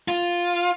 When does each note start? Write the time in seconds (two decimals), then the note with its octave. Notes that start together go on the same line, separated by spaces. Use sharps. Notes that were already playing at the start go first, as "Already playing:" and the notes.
0.08 F4